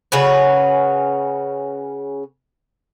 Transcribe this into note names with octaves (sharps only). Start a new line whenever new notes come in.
C#3 C#4 F#4 B4